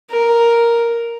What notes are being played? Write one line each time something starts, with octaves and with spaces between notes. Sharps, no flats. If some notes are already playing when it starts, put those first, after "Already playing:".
A#4